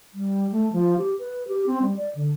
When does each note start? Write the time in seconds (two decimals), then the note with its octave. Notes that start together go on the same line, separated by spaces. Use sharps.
0.14 G3
0.52 A3
0.73 F3
0.98 G4
1.19 B4
1.48 G4
1.67 C4
1.82 G3
1.97 D5
2.15 D3